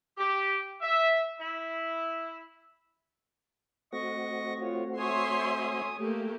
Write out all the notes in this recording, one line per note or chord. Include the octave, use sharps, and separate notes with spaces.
G4
E5
E4
A3 C4 F#4 D#5 C#6 A#6
F4 C#5
C#5 E5 G#5 C6 D#6
A3 A#3 G4